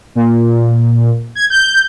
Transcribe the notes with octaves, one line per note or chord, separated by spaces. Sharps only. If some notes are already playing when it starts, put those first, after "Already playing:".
A#2
G#6
G6